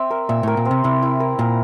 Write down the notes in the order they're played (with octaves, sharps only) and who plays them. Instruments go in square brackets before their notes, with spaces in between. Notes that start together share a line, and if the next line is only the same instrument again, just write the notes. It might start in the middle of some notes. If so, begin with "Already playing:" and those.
Already playing: [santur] C4 E5
A#4
[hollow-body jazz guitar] A#2 [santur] E5
[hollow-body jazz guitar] A2 [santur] A#4
[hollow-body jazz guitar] A#2
[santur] C4
[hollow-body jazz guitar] C3
[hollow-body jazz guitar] C3 [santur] E4
[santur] E4
A#4
[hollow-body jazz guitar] A#2 [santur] A#4